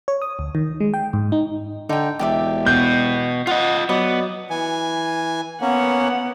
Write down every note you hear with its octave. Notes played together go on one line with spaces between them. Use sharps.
C#5
D#6
D2
D#3
G#3
G5
G#2
D#4
D3 D#4 G5
E1 G4 D5 E5
B2 B3 G6
F4 D#5 F#5
F#3 B3 B4 D5 D#5
E3 G#5
A#3 B3 C#4 F#5